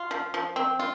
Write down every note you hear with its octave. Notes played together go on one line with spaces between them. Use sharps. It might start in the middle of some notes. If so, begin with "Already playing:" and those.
Already playing: F4
F3
F3
C4
F4